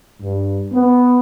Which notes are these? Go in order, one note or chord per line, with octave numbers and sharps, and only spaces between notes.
G2
B3